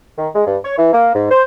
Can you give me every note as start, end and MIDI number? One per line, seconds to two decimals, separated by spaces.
0.17 0.28 51
0.34 0.42 56
0.46 0.57 43
0.64 0.76 73
0.77 0.91 52
0.92 1.11 58
1.13 1.30 44
1.30 1.44 72